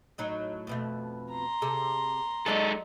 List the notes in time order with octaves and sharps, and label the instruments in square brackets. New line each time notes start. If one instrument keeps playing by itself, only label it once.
[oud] A2 F#3 D#4
F2 B2 A3
[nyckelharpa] A#5 C6
[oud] C3 G#4 A4
[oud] F#3 D5 D#5 [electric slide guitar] G#3 D#4 A4